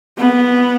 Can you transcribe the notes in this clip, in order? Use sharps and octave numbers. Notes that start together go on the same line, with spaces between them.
B3